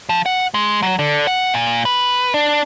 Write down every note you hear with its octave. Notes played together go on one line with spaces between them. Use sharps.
F3
F#5
G#3
F#3
D3
F#5
A#2
B4
D4